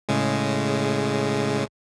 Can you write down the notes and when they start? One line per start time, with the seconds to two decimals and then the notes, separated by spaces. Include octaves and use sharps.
0.09 A2 C#3 G#3